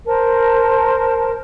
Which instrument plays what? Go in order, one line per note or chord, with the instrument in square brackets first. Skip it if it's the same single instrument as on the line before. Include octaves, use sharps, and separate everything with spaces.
[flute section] A#4 C5 A5